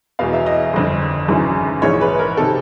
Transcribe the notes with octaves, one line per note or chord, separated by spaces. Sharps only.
E1 E2 B2 F5
E5
D#5
G1 F2 D3
G#1 F#2 C#3 E3
A#1 G#2 E3 C#5
B4
A#4
C3 D#3 A4